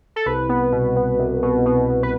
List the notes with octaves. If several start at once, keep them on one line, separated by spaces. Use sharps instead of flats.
A4
C2 B4
B3
B2
B3
C2
B2
B2
B2
B4